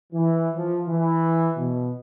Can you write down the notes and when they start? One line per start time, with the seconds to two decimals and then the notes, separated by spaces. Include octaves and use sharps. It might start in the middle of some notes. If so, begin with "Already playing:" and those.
0.13 E3
0.55 F3
0.88 E3
1.57 B2